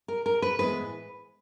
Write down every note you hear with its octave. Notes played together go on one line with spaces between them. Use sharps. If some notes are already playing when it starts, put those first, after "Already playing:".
A#4
A#4
B4
A2 E3 G#3 B3 B4